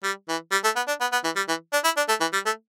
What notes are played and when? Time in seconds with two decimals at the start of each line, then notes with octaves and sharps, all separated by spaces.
0.03 G3
0.29 E3
0.52 G3
0.64 A3
0.76 B3
0.88 D4
1.01 B3
1.12 B3
1.24 E3
1.36 G3
1.48 E3
1.73 D4
1.84 E4
1.97 D4
2.08 A3
2.21 E3
2.33 G3
2.46 A3